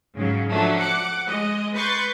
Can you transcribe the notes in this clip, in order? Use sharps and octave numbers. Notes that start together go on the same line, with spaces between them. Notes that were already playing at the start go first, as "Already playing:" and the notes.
G#2 C#3 F#3
F3 F#3 A3 D4
F#5 D6 C#7
G#3 D#5
B4 C6 C#6 G6 A6